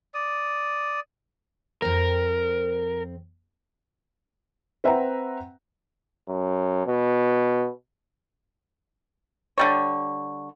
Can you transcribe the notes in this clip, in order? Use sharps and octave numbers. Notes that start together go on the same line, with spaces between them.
D5 D#6
F2 C4 A#4
C4 B4 E5 F#5 G5 A#5
F#2
B2
D3 G3 C#5